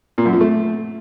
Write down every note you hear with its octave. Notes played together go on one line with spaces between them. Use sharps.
A#2
F#2
F3
A3